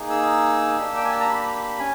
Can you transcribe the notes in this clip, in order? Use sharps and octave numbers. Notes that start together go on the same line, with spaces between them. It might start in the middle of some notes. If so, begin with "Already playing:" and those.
Already playing: A#3 D#4 G#4
E6
A#3 D4 G4
G5
G#5
A5
A#5
B5
C#4 G#5